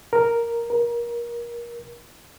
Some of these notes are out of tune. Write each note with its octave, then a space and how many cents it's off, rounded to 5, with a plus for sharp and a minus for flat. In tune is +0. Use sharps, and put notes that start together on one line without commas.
A#4 +0
A#4 +25